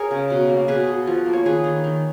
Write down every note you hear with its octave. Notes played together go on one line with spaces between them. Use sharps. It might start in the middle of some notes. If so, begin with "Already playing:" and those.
Already playing: G#4 A#4 C#5
C#3
B2
A#3
B2 G#4 B4
B2
F3
A#3
C#5
D#3 G#4 B4
D#3
D#3